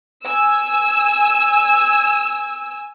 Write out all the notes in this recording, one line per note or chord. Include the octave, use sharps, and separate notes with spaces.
G#5 E6